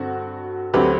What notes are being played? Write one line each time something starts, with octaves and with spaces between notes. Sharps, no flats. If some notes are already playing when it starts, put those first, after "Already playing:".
Already playing: G2 D3 C4 F#4
D2 D3 F#3 C4 G4 B4